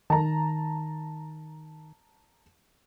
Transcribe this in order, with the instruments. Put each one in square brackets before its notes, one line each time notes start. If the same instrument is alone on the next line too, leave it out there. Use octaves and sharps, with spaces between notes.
[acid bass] D#3 [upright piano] A5 A#5